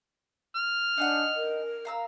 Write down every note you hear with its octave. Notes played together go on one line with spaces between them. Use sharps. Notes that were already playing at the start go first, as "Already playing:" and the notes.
F6
D4 D#4 G#4 F#5
A#4
F5 A#5 E6